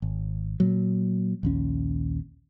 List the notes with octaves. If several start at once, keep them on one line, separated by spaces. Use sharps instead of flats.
G#1
A#2 F#3
A#1 D#2 C#4